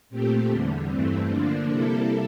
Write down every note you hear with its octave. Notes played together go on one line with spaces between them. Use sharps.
A#2 A3 C4 G4
E2 D3 G3
G2 E3 A3 C4
D3 F3 A#3 D4
C3 G3 A#3 E4 A4